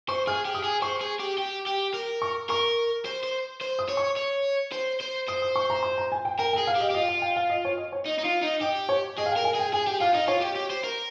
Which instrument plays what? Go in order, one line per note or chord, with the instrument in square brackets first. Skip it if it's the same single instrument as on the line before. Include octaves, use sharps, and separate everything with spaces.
[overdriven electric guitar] C5 [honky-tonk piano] C#6
[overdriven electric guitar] G#4 [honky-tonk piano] F6
[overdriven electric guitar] G4
[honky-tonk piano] D#6
[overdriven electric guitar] G#4
[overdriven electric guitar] C5 [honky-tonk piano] C#6
[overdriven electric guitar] G#4
G4
G4
G4
A#4
[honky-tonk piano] C#6
[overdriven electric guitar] A#4 [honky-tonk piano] C#6
[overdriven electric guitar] C5
C5
C5
[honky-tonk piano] D#6
[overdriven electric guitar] C#5
[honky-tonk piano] C#6
[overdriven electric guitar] C#5
C5
C5
[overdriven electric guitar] C5 [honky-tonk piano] D#6
[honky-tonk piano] D#6
C#6
A#5
C6
A#5
G#5
G5
[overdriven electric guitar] A#4 [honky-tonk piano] G5
[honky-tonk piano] G5
[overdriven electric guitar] G#4
[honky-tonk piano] F5
[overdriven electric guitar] G4
[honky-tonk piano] D#5
[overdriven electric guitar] G4
[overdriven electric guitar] F4 [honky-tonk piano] D#5
[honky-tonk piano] F5
G5
F5
D#5
C#5
D#5
C#5
[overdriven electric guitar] D#4
D#4
F4
D#4
[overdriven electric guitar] G4 [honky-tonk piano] D#5
[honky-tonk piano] C#5
[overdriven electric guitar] G#4 [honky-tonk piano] D#5
[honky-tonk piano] F5
G5
[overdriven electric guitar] A#4
[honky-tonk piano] G#5
[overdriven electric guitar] G#4
[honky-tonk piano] G5
[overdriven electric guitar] G#4 [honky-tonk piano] G#5
[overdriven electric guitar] G4 [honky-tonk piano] G5
[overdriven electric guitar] F4 [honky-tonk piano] F5
[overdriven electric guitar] D#4 [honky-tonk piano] D#5
[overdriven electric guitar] F4 [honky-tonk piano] C#5
[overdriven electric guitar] G4
G4
C5
A#4